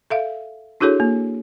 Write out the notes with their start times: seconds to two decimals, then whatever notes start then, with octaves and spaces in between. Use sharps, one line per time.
0.10 A4 E5 F5
0.80 D4 E4 F#4 G#4 A4 C#5
1.00 A#3